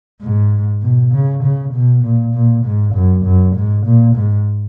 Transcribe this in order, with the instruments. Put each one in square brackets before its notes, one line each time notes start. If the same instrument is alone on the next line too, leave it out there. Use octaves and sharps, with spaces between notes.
[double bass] G#2
B2
C#3
C#3
B2
A#2
A#2
G#2
F#2
F#2
G#2
A#2
G#2